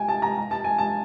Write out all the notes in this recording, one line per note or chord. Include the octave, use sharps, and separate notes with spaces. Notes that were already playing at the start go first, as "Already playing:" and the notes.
Already playing: G5 G#5
A5
A#5
A#5
A5
G#5
A5